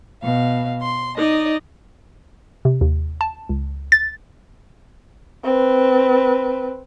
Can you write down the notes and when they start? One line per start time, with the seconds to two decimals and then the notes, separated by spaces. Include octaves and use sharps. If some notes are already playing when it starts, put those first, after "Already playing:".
0.21 B2 F5
0.81 C6
1.16 D#4 D5 D#5
2.65 C3
2.81 D#2
3.21 A5
3.49 C#2
3.92 A6
5.45 C4 B4